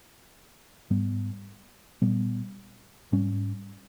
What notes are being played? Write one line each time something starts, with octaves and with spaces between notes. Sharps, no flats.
G#2 G3 B3
A#2 G3 B3
G#2 G3 C#4